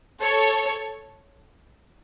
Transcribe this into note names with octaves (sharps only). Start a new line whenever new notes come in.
A4 C#5